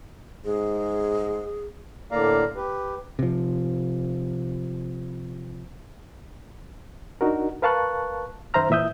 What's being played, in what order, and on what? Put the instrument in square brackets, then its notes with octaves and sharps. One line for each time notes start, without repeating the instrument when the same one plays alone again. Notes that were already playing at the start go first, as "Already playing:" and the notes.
[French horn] G#2 [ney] G#4
[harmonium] A2 D3 A#3 D5 F5 A#5
G4 B4
[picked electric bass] C3 F3
[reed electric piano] D4 D#4 F#4 A#4
A#4 B4 F5 A5 C#6 F#6
F#2 D#3 C5 E5 A#5 F6
A#2 E3 E5 D#6 G6